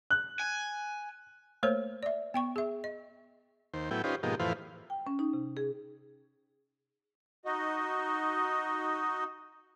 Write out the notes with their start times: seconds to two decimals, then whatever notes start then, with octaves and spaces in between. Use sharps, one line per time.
0.10 F#6
0.40 G#5
1.63 A3 A#3 A#4 C5 C#5
2.03 D5 E5
2.34 B3 G5 C#6
2.56 G#4 E5
2.84 D#5
3.74 D#2 C5
3.91 A2 F#3 B3 E4 G5
4.04 C#4 D#4 F4 G4 B4 C5
4.23 G#2 B2 F3 A#3 D#4 G4
4.40 F2 A2 E3 B4 C5 F5
4.90 G5
5.07 C#4
5.19 D#4
5.33 C3
5.57 G#4
7.45 D#4 F#4 D#5